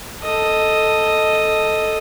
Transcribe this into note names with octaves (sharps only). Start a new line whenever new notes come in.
A4 D#5